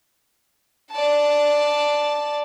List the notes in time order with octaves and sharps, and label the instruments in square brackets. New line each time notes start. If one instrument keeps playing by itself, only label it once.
[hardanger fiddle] D5 A5